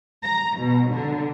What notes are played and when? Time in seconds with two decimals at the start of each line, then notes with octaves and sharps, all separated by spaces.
0.23 A#5
0.58 B2
0.90 D3